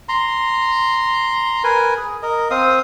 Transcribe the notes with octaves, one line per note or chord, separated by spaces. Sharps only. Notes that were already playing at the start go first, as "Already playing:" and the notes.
A#5 C6
A#4 B4 G#5
G#4
A#4 D#5
C4 F5 D#6